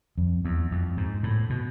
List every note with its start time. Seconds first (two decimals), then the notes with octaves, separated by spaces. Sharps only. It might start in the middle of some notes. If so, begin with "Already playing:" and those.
0.18 F2
0.45 E2
0.72 F2
0.97 G#2
1.23 A2
1.50 B2